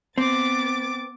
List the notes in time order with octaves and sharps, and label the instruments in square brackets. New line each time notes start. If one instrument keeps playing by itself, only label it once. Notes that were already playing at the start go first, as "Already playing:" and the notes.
[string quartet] B3 D6 A6 [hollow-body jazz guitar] C4